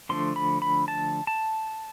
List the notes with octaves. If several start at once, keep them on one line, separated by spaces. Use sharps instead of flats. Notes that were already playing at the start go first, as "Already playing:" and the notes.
D3 F3 A3 D4 C6
B5
B5
A5
A5